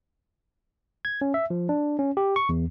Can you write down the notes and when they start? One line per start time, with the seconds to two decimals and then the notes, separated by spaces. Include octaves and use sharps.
1.05 G#6
1.21 C#4
1.34 E5
1.50 F3
1.69 D4
1.99 C#4
2.17 G4
2.36 C#6
2.49 E2